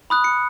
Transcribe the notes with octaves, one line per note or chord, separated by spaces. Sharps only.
B5 D#6 F#6
C#7